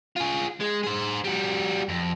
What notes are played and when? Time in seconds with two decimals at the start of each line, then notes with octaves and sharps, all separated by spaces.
0.17 F4 G#4
0.61 G#3
0.84 G#4 C5
1.24 G3 F#4
1.89 F2